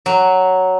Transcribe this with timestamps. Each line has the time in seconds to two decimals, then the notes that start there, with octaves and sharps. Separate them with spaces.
0.06 F#3